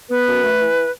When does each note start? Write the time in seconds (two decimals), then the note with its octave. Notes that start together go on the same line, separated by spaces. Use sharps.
0.10 B3 B4
0.26 F#2
0.43 A3
0.60 E3